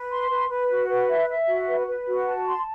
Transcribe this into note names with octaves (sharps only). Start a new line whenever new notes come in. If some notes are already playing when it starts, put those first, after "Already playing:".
Already playing: B4
C6
B4
B4
F#4
B4
E5
E5
F#4
B4
B4
F#4
A5
C6